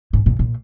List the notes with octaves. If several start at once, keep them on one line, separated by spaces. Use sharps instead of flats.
G#2
A#2
A#2